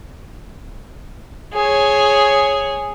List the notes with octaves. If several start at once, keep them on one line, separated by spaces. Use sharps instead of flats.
G#4 C#5